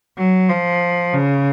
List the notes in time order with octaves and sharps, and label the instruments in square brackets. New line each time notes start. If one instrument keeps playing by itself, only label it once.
[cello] F#3
F3
C#3